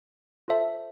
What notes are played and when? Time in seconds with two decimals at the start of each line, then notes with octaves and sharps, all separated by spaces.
0.48 F4 A4 C5 E5 A5